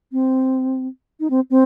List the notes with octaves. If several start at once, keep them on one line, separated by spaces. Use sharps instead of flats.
C4
D#4
C4
C4